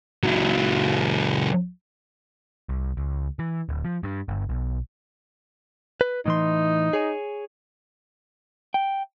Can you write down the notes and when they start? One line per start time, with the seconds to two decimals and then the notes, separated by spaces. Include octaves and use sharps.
0.23 C#2 F#3
2.69 C2
2.97 C#2
3.39 E3
3.69 D1
3.85 F3
4.03 G2
4.28 G1
4.49 B1
6.01 B4
6.26 A2 E3 D#4 C6
6.93 G#4 C#5 G#5
8.74 G5